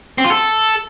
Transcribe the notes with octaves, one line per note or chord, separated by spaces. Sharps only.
C4
F4
A4